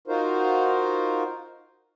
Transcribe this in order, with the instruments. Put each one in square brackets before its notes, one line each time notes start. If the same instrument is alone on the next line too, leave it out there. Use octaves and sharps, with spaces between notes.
[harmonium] D#4 F4 F#4 A#4 C5